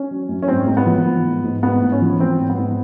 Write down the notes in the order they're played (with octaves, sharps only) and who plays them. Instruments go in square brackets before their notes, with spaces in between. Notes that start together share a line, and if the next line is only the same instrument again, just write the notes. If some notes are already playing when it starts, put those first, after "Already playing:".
Already playing: [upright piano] C#4
F#3
F#2
C#4
G#2 C4
G#2
B3
F3
F3
G#2
G#2
G#2 B3
G#2
C#4
F3
F3 C4
G#2
B3
G#2